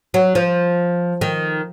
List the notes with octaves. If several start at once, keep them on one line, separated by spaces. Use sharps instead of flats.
F#3
F3
D#3